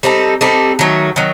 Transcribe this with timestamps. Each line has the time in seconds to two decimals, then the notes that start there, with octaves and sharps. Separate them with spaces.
0.03 G3 C4 D#4 A4
0.41 G3 C4 D#4 A4
0.79 D#3 F#3 A3
1.16 D#3 F#3